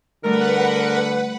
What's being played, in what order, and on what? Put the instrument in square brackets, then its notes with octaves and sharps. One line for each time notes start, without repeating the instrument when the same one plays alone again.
[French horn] D3 [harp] G3 A3 [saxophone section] A#4 [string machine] B4 F#5